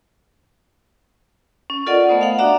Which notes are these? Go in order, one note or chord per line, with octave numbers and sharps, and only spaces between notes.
C#4
F4 A4 A#4 D5 D#5 F#5
A3 B3 C5 D#6
F5 F#5
D4 F#4 D5 E5 A#5